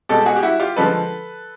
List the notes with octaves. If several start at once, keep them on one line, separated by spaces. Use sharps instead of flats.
B2 G#3 G4 A4
F#4 G#4
G4
E4 F#4
F4 G4
D3 F3 G#3 A4 B4